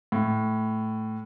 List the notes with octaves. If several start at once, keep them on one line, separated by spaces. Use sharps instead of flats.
A2